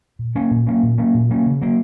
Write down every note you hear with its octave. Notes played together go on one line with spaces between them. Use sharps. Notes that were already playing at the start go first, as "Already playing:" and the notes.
A#2
F#3 A#3 C#4
A#2
F#3 A#3 C#4
A#2
F#3 A#3 C#4
A#2
F#3 A#3 C#4
C#3
F#3 A#3